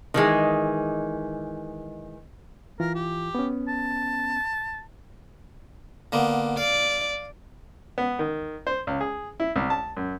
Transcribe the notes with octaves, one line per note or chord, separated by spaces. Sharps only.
D#3 E3 G#3
E3 F4 A#4
G4
B3 C#4
A5
D3 A#3 B3
D5 F5
B3
D#3
C5
C#2
G#4
E4
C2
A5
F#2